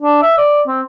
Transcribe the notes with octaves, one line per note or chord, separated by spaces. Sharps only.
D4
E5
D5
C4